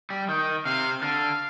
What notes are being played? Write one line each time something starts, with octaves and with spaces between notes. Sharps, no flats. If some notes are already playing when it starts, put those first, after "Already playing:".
G3
D#3 G5
C3 F5
D3 F5